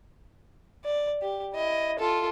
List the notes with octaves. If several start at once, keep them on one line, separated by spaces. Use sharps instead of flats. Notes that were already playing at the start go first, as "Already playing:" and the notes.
D5
G4
E4 D#5
F4 A4